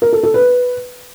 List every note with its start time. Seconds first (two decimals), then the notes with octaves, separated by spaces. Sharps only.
0.02 A#4
0.13 A4
0.23 A4
0.34 B4